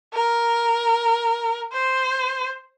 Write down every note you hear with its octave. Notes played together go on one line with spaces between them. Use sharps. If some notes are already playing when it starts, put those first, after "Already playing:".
A#4
C5